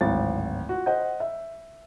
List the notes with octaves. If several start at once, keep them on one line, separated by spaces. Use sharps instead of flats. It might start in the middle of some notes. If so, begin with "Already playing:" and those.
D1 G#1 F#3 E4 A6
F4 F#4
C5 D#5 F#5 G6
E5